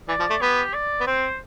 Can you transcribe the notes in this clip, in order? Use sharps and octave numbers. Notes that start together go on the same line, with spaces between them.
E3 D5
F3
A3
B3 G4
D5
B3
C4 C5